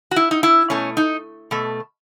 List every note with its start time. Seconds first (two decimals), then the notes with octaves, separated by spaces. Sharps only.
0.11 F#4
0.16 E4
0.31 D#4
0.43 E4
0.70 B2 A3 C#4
0.97 D#4
1.51 B2 A3